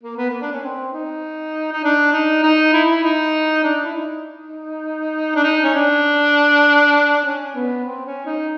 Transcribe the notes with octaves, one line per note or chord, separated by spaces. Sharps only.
A#3
B3
A#3
D4
C#4
C4
D#4
D#4
D4
D#4
D#4
E4
E4
D#4
D4
E4
D#4
D4
D#4
C#4
D4
C#4
B3
C4
C#4
D#4